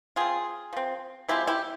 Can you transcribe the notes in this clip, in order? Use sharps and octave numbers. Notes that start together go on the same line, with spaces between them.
F3 C4 F4 G#4
F3 C4
F3 G#3 C4 E4 G4
E4 G4